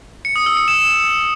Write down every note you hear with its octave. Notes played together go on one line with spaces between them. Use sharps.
C#7
D#6
E6
C#7
E7